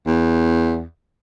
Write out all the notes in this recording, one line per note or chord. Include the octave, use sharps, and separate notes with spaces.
E2